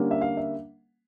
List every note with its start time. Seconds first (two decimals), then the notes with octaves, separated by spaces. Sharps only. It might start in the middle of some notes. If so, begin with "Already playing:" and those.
Already playing: D3 G3 A#3 C#4
0.11 E5
0.21 F5
0.37 E5